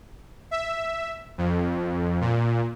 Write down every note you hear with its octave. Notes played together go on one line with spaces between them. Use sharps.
E5
F2
A#2